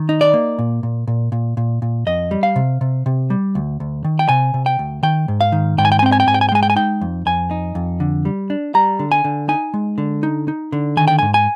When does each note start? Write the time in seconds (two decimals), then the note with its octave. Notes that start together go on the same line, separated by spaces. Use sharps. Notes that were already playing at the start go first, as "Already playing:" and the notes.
Already playing: D#3
0.09 D#4
0.21 D5
0.34 A#3
0.59 A#2
0.83 A#2
1.08 A#2
1.32 A#2
1.57 A#2
1.82 A#2
2.06 F2 D#5
2.31 G3
2.43 F5
2.56 C3
2.81 C3
3.06 C3
3.30 G3
3.55 D2
3.80 D2
4.04 D#3
4.19 G5
4.29 C3 G#5
4.54 C3
4.66 G5
4.79 D2
5.03 D#3 G5
5.28 G#2
5.41 F5
5.52 D#3
5.78 G#2 G5
5.85 G#5
5.92 G5
5.99 G#5
6.03 C4 G5
6.12 G#5
6.20 G5
6.27 G#2 G#5
6.34 G5
6.41 G#5
6.49 G5
6.52 G#3 G#5
6.63 G5
6.70 G#5
6.76 D#4 G5
7.01 F2
7.26 F2 G#5
7.51 D#4
7.75 F2
8.00 D3
8.25 G3
8.50 D4
8.75 G3 A#5
8.99 D3
9.12 G#5
9.24 D3
9.48 D#4 G#5
9.74 G#3
9.98 D3
10.23 D#4
10.48 D#4
10.72 D3
10.97 D#3 G#5
11.08 G5
11.19 G#2 G#5
11.34 G#5